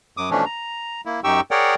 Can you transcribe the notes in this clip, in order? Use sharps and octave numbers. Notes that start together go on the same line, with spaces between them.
F#2 D6 D#6
B2 E3 F3 A3 C#4 D4
A#5
A#3 E4
F#2 D#4 G4 G5 C#6 E6
G#4 A#4 C#5 D5 F#5 G5